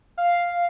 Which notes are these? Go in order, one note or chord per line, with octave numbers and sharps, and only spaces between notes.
F5